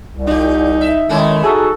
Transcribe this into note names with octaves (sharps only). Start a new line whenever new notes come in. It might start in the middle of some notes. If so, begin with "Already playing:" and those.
C2
D#4 F4 G4
E5
D#3 G#3 A3 C#4 E4
D#4 F#4 G#4 A4